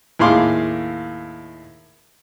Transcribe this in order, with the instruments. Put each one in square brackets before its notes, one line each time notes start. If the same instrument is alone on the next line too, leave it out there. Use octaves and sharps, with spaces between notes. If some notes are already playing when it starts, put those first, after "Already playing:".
[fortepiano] D#2 A2 G#4 F5 C6 D6